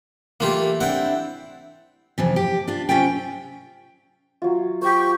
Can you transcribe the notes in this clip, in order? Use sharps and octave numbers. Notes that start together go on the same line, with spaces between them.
E3 A3 A#3 F4 G4
C4 D4 E4 F#5 G5
F2 C3 E3
G4
D4 F4
C3 C#4 F4 E5 G5
F#3 F4
G4 C5 C#6